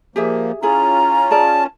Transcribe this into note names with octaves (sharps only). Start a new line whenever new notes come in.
A#2 F3 A#3 G4 G#4 E5
C#4 E4 F4 G#4 A#5
G#4 D5 A5